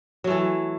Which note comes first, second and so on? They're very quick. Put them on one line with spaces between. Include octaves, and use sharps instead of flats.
F#3 A3 E3